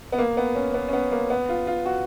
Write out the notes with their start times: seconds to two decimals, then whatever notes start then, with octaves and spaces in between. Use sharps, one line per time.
0.12 B3
0.18 A#3
0.37 B3
0.55 C#4
0.74 B3
0.88 C#4
0.93 B3
1.12 A#3
1.30 B3
1.49 F4
1.67 F4
1.86 F#4